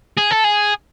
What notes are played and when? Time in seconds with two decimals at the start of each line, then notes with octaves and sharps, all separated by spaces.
0.17 G#4
0.31 A4
0.44 G#4